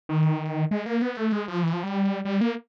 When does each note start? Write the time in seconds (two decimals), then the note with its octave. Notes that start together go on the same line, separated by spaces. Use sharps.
0.09 D#3
0.71 G#3
0.86 A#3
1.02 B3
1.17 A3
1.32 G#3
1.48 F3
1.63 E3
1.73 F3
1.83 G3
2.25 G3
2.41 A#3